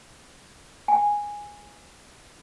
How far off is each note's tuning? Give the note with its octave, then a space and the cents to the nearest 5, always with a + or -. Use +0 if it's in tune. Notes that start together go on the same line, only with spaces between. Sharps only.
G#5 -5